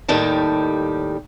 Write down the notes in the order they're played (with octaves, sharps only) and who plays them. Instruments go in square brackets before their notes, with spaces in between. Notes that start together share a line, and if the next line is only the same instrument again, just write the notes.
[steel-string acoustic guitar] D#2 A2 D#3 G3 A5